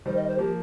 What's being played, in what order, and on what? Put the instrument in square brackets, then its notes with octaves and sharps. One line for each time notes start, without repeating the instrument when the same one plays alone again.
[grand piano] D#3 G3 [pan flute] C5
[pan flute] D#5
C5
[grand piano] F3 A#3 [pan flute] G4